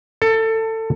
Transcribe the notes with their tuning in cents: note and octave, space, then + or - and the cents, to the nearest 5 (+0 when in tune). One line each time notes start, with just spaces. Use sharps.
A4 +20